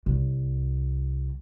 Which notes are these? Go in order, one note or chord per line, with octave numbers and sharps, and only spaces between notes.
C2